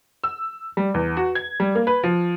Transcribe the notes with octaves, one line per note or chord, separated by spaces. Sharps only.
E6
G3
E2
F#4
G#6
G3
A#3
B4
F3